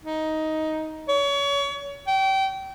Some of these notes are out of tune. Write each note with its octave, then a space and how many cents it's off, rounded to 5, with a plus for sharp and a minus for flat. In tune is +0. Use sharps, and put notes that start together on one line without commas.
D#4 +10
C#5 +30
G5 -25